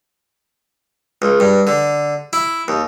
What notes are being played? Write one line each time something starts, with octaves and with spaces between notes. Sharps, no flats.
C#2
G2
D3
E4
D#2